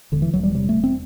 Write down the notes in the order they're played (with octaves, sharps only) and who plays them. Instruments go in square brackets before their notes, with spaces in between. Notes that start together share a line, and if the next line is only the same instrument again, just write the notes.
[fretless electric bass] E1 D3
E3
E1 F#3
G3
C3 G3
A3
E1
C4